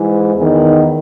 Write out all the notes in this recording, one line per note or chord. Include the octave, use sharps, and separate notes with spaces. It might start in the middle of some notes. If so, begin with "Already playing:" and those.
Already playing: G#2 E3
E2 D#3